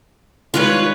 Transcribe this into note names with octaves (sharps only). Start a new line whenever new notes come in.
D#3 G3 G#3 F4 B4 C#5